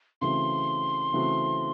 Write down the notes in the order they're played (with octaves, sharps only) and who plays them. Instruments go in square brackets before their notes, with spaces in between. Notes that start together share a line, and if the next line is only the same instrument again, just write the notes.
[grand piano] C#3 E3 A3 C4 F#4 [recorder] C6
[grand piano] C#3 E3 A3 C4 F#4